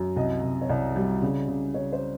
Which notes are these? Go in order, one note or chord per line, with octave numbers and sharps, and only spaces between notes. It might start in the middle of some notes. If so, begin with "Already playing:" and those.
Already playing: F#2
C2 D#5
C2
C#5
C2 D5
G3
C#3
C#3
C#3 C#5
C5